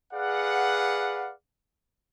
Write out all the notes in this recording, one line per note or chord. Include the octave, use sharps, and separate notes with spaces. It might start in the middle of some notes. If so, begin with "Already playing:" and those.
G#4 B4 D5 F5 F#5